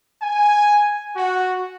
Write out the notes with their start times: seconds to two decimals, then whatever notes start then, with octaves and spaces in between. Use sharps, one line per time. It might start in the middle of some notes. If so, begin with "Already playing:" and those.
0.22 G#5
1.15 F#4